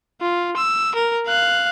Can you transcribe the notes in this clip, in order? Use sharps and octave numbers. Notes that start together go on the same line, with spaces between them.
F4
E6
A#4
F5 F#6